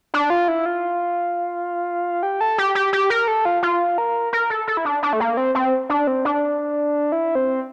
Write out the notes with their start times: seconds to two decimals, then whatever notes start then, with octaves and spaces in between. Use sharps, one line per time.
0.14 D4
0.30 F4
0.48 E4
0.66 F4
2.23 G4
2.41 A4
2.58 G4
2.75 G4
2.93 G4
3.10 A#4
3.28 A4
3.45 F4
3.63 F4
3.98 A#4
4.33 A#4
4.50 A4
4.67 A4
4.77 E4
4.85 D4
5.03 D4
5.13 A3
5.20 A#3
5.37 C4
5.55 C4
5.90 D4
6.07 C4
6.25 D4
7.12 E4
7.35 C4